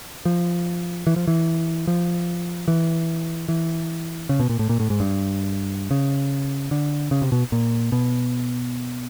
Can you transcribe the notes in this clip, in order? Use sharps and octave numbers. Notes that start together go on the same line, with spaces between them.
F3
E3
F3
E3
F3
E3
E3
C#3
B2
A#2
A2
A#2
A2
G#2
G2
C#3
D3
C#3
C3
B2
A#2
B2